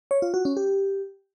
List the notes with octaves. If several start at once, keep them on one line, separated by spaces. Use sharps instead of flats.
C#5
F4
F#4
C#4
G4